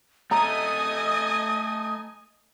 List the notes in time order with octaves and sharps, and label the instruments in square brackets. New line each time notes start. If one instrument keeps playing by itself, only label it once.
[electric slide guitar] A3 D#4 A4 [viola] D#5 G#5 [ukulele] A#5 [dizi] D#6